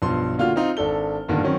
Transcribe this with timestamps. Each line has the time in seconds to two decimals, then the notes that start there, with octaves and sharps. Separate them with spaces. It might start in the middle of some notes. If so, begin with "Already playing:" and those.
0.02 B1 G2 F3 C6
0.38 A#2 D3 F4 F#4 F6
0.56 C4 D#4 F4
0.77 G#1 D4 A4 G7
1.28 G1 G2 A#2 D3 D#3
1.43 D#3 F#3 C4 C#4